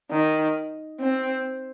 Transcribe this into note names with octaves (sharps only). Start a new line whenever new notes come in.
D#3
C4